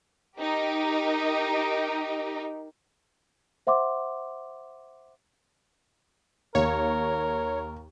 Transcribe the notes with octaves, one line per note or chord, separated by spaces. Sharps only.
D#4 G4 A#4
C5 E5 F#5 C6 D6
D#2 A#4 C#5